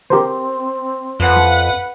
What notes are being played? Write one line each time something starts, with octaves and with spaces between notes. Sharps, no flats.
C4 G4 A#4 C5
F2 B4 F#5